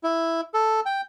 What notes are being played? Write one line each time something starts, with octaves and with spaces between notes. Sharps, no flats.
E4
A4
G5